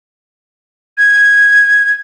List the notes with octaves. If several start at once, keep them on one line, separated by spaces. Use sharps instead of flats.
G#6